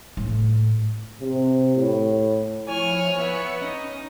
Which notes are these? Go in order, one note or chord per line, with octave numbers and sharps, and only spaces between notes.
A2
C3
A2
F3 E4 C#5 G#5 F6
B3 E5 C#7
C#4 D#4 D#5